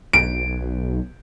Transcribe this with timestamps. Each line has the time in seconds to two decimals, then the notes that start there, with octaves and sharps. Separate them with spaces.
0.13 B1 D7